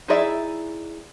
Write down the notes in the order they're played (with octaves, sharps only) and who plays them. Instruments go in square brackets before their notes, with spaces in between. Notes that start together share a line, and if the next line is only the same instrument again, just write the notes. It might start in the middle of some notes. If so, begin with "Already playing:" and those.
[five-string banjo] D#4 E4 G#4 D5 E5